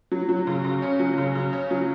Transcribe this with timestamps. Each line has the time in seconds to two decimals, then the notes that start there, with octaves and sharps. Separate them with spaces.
0.12 F#3
0.29 F#3
0.47 C#3
0.64 C#3
0.82 C#4
1.00 F#3
1.18 C#3
1.35 C#3
1.53 C#4
1.71 F#3